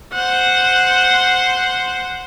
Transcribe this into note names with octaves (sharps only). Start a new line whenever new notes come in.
C5 F#5